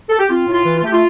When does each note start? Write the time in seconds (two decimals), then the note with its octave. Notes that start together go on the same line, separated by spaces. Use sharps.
0.10 A4
0.19 G4
0.30 C4 F4
0.47 A2
0.53 F4
0.65 E3
0.78 F4
0.83 A3 G4
0.92 F4